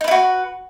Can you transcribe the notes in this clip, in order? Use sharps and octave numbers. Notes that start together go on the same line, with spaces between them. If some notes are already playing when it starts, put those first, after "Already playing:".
D#4 E4 F#4 B4